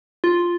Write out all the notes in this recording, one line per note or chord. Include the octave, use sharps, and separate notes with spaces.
F4